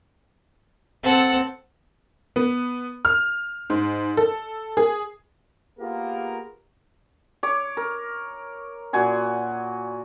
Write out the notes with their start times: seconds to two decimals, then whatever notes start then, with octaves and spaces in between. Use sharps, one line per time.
1.04 C4 A4 F#5
2.36 B3
3.05 F6
3.70 G#2
4.17 A4
4.77 G#4
5.79 A#3 B3 F4 G4 G#4 A#4
7.43 C#5 D6
7.77 A#4
8.93 A#2 F#4 G#5 C6